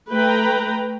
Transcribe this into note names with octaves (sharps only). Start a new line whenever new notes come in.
A3 B4 G5 A#5